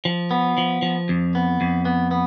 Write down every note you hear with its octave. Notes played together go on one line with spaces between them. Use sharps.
F3
B3
F3
F3
F2
B3
F2
B3
B3